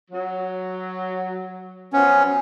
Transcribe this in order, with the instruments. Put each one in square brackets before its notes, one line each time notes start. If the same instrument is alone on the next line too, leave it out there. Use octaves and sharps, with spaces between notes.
[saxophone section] F#3
[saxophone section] F#2 F3 B3 [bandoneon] C#4